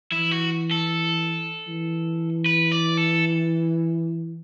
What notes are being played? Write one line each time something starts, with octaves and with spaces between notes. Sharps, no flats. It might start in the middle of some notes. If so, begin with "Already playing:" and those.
E3 E4
F#4
A4
E3
B4
D5
A4